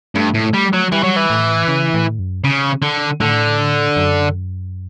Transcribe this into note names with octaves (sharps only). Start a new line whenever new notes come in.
G2 A3
A2
G3
F#3
E3 G3
F#3
E3
A2
C#3
A2
F#2
C#3
D3
A2 D3
F#2